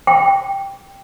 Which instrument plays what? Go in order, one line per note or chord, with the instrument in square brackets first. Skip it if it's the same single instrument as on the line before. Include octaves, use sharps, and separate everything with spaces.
[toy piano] G5